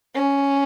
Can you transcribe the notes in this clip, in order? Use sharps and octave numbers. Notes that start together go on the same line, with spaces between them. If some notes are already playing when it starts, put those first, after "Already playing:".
C#4